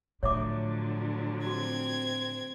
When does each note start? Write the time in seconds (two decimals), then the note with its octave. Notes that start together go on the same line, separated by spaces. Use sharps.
0.23 A2 D3 F3 F#3 C#5 E5 D6
1.47 C4 F#4 G#6